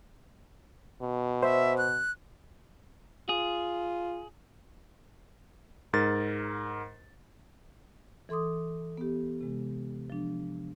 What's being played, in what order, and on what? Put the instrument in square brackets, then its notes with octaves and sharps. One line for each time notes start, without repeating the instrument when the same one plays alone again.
[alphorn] B2
[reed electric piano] C5 [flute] E5
[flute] F#6
[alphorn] F4 [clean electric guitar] G#4
[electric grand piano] G#2 A#4 A6
[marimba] E3 A4 C6 D6 D#6
B3 G4
C3 G#3
F3 D4